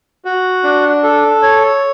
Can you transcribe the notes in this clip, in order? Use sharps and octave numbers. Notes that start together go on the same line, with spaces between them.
F#4
D4
A4
C#5